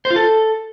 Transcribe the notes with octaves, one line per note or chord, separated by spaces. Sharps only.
C5
F4
A4